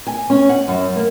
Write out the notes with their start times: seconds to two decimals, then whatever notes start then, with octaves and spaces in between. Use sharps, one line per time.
0.07 G#5
0.30 C#4
0.49 F#5
0.68 F#2
0.96 A#3